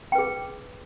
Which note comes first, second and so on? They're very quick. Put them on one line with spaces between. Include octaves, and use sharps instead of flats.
G5 B4 G#4